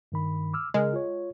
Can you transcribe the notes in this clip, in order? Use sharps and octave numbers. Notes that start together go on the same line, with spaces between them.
G2 D#3 B5
D6 E6 F6
C#3 G#3 A#4 F6
F4 C#5